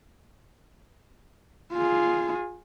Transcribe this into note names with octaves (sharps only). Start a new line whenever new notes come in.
F4 G#4